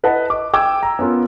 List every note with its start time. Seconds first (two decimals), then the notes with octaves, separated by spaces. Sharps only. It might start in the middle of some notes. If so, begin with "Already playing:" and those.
0.03 E4 B4 D#5 F#5 A5
0.30 D#5 D6
0.54 G5 D6 E6 G#6
0.83 A#5
0.99 B3 C#4 F4 A#4